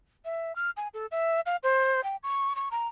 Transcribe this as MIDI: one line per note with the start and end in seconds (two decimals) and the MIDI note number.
0.25 0.55 76
0.56 0.70 89
0.77 0.88 80
0.94 1.06 69
1.11 1.40 76
1.46 1.56 77
1.63 2.01 72
2.04 2.16 79
2.23 2.53 85
2.56 2.69 85
2.71 2.87 82